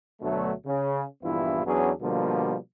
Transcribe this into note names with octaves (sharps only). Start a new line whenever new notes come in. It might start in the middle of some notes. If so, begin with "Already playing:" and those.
D2 B2 D3 F#3 A3
C#3
A#1 G2 E3 B3 E4 F4
E2 F#3 B3 C#4 D4 G#4
B2 D3 F3 G3 A#3